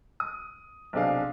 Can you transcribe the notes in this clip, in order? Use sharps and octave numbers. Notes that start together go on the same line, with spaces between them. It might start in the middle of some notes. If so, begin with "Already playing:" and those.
D#6
B1 C3 C4 D4 G#4 F5